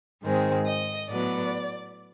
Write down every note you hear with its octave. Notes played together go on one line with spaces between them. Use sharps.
G#2 D#3 G#3 C4
D#5
A2 F#3 B3 D5